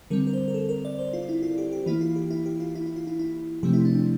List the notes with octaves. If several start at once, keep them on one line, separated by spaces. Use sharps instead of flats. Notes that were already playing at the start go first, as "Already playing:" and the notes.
D3 G3 C4 A#4
A#4
C5
A#4
A4
A#4
D5
C5
F4
E4
F4
G4
G4
E3 A#3 E4
F4
G4
E4
G4
F4
E4
E4
F4
E4
E4
C3 F3 A3 C4 G4
E4
D4
D4